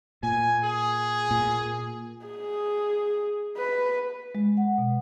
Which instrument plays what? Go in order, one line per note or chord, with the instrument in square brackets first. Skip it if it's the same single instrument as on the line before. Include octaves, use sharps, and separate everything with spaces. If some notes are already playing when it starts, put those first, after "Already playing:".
[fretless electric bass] A#2 [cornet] G#5
[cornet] G#4
[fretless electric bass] A#2
[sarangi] G#4
B4
[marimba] G#3
F#5
B2